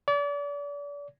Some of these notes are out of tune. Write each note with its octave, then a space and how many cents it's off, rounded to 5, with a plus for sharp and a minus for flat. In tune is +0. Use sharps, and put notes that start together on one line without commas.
D5 -35